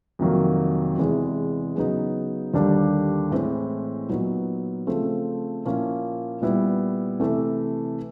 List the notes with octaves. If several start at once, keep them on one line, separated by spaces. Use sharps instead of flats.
F2 C3 D#3 F#3 A#3
E2 C3 E3 G#3
C#3 F#3 B3 D#4
D#2 D3 G3 A#3 D4
A2 E3 G#3 C4
A#2 F#3 B3 D#4
C#3 F3 A3 C4
A#2 F3 A#3 C#4 E4
A#2 G3 B3 E4
C3 E3 A3